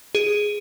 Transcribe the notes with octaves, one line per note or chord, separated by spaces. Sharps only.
G#4